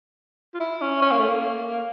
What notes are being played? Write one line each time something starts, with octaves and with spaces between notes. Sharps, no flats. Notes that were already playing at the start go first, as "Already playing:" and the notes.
F4
E4
C#4
C#4
A#3
A3
A#3